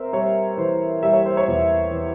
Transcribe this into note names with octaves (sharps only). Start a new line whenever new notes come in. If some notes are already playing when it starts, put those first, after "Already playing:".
Already playing: C4 A#4 C5 E5
G3 C#5
E3 C5
G3 E5
C#5
C5
C#5
E2
E3